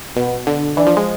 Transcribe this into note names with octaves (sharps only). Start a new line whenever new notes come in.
B2 B3
D3
E3 D4
F3
G#3